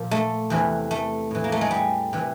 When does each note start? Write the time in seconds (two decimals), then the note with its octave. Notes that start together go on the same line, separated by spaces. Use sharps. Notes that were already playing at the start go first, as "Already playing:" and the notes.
Already playing: A#2 F3
0.11 A3
0.50 E2 C3 E3
0.91 A3
1.31 A2 E3
1.44 A#3
1.52 A3
1.61 G#3
1.71 G3
2.13 C3 E3